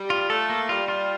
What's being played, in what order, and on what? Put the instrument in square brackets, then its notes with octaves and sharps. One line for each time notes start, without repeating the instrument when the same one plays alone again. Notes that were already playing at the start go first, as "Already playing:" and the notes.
Already playing: [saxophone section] G3
[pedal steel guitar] F4
[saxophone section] A3 [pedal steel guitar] A4
[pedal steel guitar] A#3
[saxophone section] G3 [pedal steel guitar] F4
[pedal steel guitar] F4